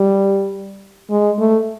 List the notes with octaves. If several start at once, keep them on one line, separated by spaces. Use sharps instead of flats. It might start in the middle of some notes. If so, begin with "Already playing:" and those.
Already playing: G3
G#3
A3